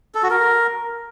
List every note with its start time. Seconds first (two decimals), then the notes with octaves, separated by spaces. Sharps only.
0.15 A4
0.23 F#4
0.30 A#4